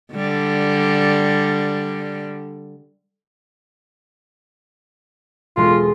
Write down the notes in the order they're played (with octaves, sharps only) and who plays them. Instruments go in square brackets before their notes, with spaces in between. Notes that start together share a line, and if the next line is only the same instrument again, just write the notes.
[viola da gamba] D3 G3
[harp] E1 G#3 C6 [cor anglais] F4